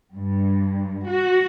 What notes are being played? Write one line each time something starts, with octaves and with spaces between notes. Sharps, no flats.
G2
F#4